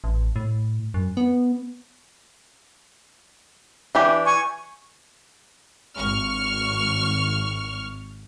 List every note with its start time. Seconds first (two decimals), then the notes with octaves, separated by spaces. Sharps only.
0.04 A1
0.36 A2
0.94 F#2
1.17 B3
3.95 E3 D4 G4
4.25 G#5 C#6
5.98 G#1 C#6 F6